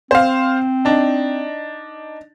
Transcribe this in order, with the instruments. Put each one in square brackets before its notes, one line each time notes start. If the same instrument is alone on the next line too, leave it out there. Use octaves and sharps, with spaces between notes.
[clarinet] C4 [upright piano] C5 F5
[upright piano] D4 D#4